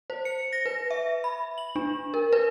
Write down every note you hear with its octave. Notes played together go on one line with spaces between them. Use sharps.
C5
C#7
A#6
B4
E5
B5
F#7
D4
A#4
B4